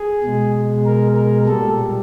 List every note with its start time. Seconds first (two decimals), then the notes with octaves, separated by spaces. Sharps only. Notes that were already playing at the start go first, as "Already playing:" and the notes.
Already playing: G#4
0.24 B2 G#3
0.86 A#4
1.16 A#4
1.46 A#2 G3 A4